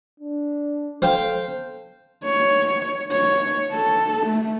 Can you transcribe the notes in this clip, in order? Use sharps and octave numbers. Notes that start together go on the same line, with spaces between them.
D4
A4 C5 F5 G5
C#5
C#5
A4
A3